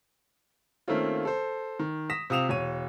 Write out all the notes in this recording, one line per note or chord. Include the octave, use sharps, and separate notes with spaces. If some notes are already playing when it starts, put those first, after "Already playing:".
D#3 A3 A#3 C4 C#4 F4
A4 C5
D#3
D#6 A#6 B6 E7
C3 F4 D#6 E7 F7
E1 C#5 D#7